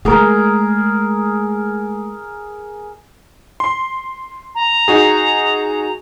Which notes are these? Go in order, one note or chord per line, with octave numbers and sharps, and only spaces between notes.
G#3 A3 G#4 A#4
C6
A#5
D#4 F#4 G#4